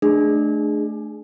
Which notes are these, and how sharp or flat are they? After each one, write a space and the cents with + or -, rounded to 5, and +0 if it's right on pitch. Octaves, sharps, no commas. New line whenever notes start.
A3 -10 D4 +20 G#4 +0